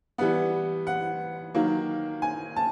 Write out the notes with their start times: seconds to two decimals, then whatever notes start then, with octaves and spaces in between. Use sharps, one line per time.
0.18 E3 G3 B3 F#5
0.87 F#5
1.55 D#3 F#3 A#3
2.22 G#5
2.56 A5